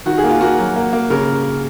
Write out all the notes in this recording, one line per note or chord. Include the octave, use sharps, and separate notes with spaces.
D#3 F#4
G#4
A#3
F4
A#3 F#4
F#3
A#3
A#3
C#3 A#4